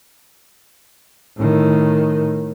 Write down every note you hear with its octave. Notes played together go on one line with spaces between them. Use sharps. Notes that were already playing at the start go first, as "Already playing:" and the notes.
A2 D#3